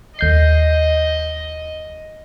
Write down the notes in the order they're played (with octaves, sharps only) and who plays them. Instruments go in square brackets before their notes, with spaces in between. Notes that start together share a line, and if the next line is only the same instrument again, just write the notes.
[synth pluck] D#2 G6 C7 [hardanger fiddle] D#5